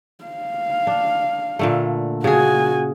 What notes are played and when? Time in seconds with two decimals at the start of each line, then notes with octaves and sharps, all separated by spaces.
0.25 F5
0.87 D4
1.59 A#2 D3 A3
2.24 C#3 F#4 G#4 G#5